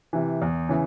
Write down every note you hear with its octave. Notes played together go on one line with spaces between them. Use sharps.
C3 E3
E2
C#3 E3